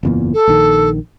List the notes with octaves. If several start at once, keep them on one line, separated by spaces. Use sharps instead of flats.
F#1 E2 A#2
A4
A#1 D#3